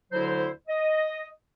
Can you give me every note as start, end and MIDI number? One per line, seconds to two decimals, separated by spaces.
0.12 0.49 38
0.12 0.49 50
0.12 0.49 54
0.12 0.49 64
0.12 0.49 72
0.68 1.28 75